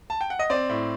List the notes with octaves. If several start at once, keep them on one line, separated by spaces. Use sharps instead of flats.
A5
G5
F#5
D#5
C4 D5
A2